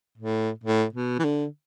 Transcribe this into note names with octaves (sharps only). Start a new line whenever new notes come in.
A2
A2
B2
E3
D3